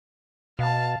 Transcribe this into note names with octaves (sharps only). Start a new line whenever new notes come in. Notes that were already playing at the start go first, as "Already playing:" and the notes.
B2 F5 A5